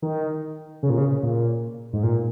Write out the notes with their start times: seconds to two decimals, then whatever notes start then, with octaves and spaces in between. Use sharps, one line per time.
0.02 D#3
0.83 C#3
0.90 A#2
0.98 C#3
1.23 A#2
1.93 G#2
2.03 A#2